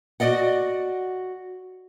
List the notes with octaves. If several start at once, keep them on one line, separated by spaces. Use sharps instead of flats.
F#4 A4 D5 D#5 F#5